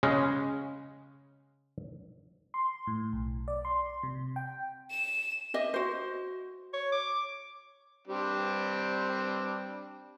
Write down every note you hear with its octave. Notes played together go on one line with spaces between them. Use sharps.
C#3 G#3 C#4
C6
A2
B1
D5
C6
C3
G5
E7
G4 D#5 E5
F#4 C5
C#5
D6
G3 C4 D4